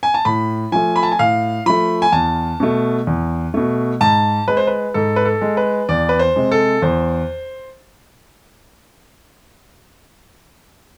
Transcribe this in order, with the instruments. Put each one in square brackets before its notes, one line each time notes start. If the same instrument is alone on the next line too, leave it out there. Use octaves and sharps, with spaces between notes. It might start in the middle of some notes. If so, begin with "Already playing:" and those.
[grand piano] G#5
A5
A2 B5
F3 A3 G#5
B5
A5
G#5
A2 F5
F3 A3 B5
G#5
E2 A5
B2 A3
E2
B2 A3
G#2 A5
G#3 B4
C5
B4
G#2 A4
B4
A4
G#3
B4
E2 D5
B4
C5
C3 G#3
A4
E2 C5